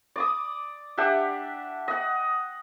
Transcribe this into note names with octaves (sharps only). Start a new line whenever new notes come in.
D5 D6 D#6
D4 G4 E5 F#5
D#5 F#5